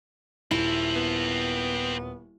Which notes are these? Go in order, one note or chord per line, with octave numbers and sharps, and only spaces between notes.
D#1 C4 E4 A4
B3